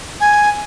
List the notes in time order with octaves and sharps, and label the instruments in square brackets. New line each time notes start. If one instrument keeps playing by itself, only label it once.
[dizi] G#5